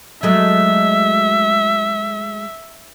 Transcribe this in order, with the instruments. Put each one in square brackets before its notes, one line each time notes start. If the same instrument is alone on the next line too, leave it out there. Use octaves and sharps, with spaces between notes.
[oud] F#3 G#3 A3 [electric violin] E5